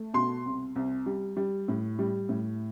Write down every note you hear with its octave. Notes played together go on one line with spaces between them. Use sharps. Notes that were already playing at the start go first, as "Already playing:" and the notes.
Already playing: A3
B2 C6
C2
C2
G3
G3
A2
G3
A2